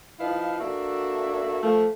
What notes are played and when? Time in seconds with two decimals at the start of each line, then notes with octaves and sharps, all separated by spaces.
0.20 F3 D#4 E4 B4 F5
0.60 A#3 D4 F#4 A4 E5
1.63 F3 A3